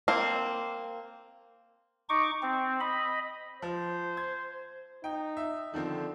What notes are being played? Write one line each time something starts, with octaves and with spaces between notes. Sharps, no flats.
A#3 C4
D#4 C#6 D6
C4
D#5 B5
F3 C5
G#6
D#4 G5
E5
D3 D#3 F3 C4